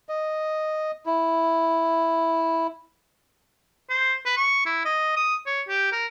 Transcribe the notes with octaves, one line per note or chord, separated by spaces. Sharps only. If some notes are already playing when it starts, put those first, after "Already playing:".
D#5
E4
C5
B4
C#6
E4
D#5
D#6
C#5
G4
A#4